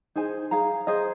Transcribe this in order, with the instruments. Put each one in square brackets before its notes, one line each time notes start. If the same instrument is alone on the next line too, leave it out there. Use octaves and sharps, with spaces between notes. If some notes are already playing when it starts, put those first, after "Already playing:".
[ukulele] D#4 G#4 C5 G#5
G#4 F5 A#5
G#4 C5 D#5